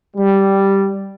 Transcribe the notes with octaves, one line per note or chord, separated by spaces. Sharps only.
G3